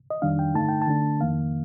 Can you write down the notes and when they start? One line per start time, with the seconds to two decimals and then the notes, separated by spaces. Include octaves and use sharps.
0.10 D#5
0.22 F2 D#3 G3 D4 F5
0.39 G5
0.55 G2 D3 A3 D#4 A5
0.68 G5
0.82 A5
0.88 D3 A3 D4
1.20 F2 D#3 A#3 F5